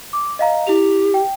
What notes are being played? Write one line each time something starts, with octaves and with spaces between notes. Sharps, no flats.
D6
D#5 F5 A#5
E4 G4 F7
G5